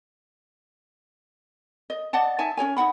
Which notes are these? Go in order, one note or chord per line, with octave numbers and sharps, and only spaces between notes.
D#5
D5 D#5 F#5 A5
D#4 E5 G#5 A5
C#4 A4 C#5 G#5
D#4 F#4 F#5 B5